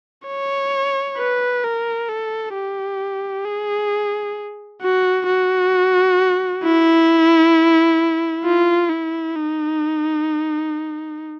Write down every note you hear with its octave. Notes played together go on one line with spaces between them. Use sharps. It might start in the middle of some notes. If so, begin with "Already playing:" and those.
C#5
B4
A#4
A4
G4
G#4
F#4
F#4
E4
F4
E4
D#4